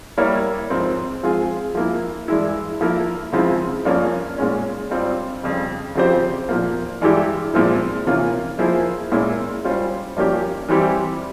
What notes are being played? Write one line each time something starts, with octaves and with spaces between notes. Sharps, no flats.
G3 A#3 E4 A#4 C#5
G#2 F3 C4
F3 G#3 C4 F4 G#4
F3 A#3 E4
G2 E3 G#3 E4
F3 A#3 E4 A#4
C#3 F3 G#3 C4 E4
G2 F3 A#3 C#4
A#2 G#3 C#4
G2 G3 C4 F4
F2 C#3 G3
C#3 F3 C4 G4 C5
A#2 F3 A#3
G2 E3 G#3 E4 G4
A#2 F3 G#3 C4 E4
C3 E3 A#3 C#4 F4
F3 A#3 E4 G#4 C5
A#2 G#3 C#4 E4 A#4
G3 C#4 F4 C5
G2 F3 A#3 C#4 G4
E3 G3 C4 E4 G4